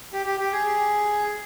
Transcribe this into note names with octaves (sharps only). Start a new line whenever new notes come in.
G4
G4
G4
G#4